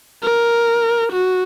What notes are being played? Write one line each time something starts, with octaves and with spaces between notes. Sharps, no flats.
A#4
F#4